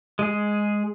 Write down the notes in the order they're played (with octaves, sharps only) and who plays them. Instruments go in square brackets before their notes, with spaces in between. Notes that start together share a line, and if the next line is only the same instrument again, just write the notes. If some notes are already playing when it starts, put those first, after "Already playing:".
[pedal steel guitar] G#3 G#4